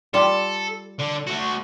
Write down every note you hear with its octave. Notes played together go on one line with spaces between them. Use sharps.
G3 F4 A4
D3
A3 F#4